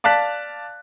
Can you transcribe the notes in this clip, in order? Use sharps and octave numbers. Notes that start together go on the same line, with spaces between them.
D5 F5 A5 F#6 B6